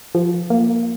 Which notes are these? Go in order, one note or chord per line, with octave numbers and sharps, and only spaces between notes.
F3
A#3